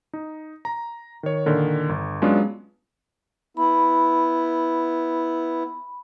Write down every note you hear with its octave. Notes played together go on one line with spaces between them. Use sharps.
D#4
A#5
D#3 C#5
A#2 D3 D#3
G1
F#3 G#3 B3 C#4 D4 F4
B3 E4 B5